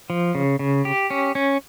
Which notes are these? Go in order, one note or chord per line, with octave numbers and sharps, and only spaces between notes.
F3
C#3
C#3
G4
C#4
C#4